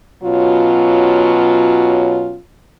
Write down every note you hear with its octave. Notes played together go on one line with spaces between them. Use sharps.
B2 F#3 C#4 F4